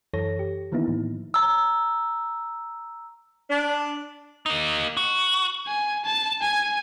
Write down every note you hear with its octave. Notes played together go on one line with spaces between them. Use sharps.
F#2 E3 A4 C#5 A#6
G4
D#3 E3 A#3 B3 D#4 E4
A2 F3
A#5 E6
D4
A#3 D#4
F#4
G#5
A5
G#5